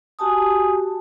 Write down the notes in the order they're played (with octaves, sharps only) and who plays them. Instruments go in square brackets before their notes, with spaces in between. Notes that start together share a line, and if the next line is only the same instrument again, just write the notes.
[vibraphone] F#4 G4 G#5 A5 D#6